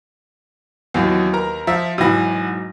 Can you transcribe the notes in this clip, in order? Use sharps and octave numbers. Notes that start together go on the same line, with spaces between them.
D#2 E3 F#3 B3
A#4 B4 A#5
F3 E5
G#2 B2 E3 F#3 A#6